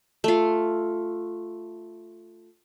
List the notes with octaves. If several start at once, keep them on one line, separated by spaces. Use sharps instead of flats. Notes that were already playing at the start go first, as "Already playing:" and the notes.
A3 F4